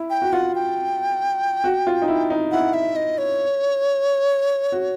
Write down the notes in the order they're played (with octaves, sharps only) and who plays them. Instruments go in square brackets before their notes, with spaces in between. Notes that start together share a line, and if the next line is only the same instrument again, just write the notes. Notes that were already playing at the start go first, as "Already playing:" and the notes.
Already playing: [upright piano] E4
[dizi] G5
[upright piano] F#4
[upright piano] F4 [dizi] F#5
[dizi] G5
[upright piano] F#4
F4
D#4
E4
D#4
[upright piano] E4 [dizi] F#5
[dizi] E5
D#5
C#5
[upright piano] F#4